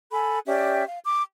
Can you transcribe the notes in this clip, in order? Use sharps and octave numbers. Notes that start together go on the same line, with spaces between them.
A4 G#5 B5
C#4 G4 D5 E5
F5
D6